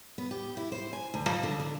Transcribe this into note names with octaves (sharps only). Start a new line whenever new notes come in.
B3
G4
E4
C5
G#5
D2
F3
D3
D3